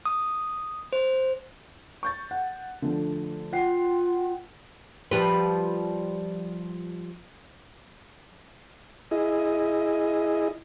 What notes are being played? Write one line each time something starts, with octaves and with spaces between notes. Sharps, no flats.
D#6
C5
C#6 G6 A6
F#5
D3 F3 A3
F4 F#5 G5 C7
F3 G3 B4
E4 G#4 D#5